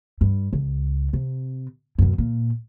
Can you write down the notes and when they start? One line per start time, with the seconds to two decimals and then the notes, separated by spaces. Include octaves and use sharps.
0.21 G2
0.53 C#2
1.13 C3
1.98 F#2 B2
2.18 A#2